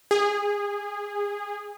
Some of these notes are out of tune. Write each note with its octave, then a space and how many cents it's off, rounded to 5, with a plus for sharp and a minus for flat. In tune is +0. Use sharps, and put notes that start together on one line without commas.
G#4 -20